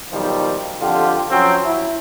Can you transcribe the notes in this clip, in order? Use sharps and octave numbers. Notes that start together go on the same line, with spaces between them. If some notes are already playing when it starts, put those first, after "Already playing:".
B1 D#3 F3 G3
F2 D3 F4 G4
F3 F#3 C4 C#4
E4